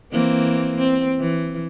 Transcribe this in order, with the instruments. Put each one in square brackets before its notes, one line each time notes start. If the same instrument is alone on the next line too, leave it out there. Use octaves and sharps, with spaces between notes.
[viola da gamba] E3 A#3 C4
C4
E3